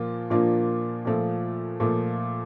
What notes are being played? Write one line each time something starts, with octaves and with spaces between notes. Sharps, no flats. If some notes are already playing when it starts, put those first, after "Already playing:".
Already playing: A#2 F3 A#3 F4
A#2 F3 A#3 D4 F4
A#2 F3 A3
A#2 F3 A3